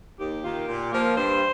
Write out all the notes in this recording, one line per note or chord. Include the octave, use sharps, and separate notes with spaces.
D#2 G4
D#3 A#3 F4
A#2
F3 A#3
G2 C5